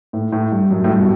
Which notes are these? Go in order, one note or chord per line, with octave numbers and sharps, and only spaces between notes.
A2
A2
G2
F#2
A2
G2
B2